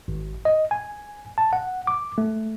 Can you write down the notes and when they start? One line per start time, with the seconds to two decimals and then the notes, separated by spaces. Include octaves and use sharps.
0.08 G#1
0.45 D#5
0.71 G#5
1.38 A5
1.53 F#5
1.87 D6
2.18 A3